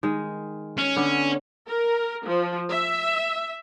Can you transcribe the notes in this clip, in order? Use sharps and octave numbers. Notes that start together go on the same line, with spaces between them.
D#3 G#3
C#4
D3 B3
A#4
F3
E5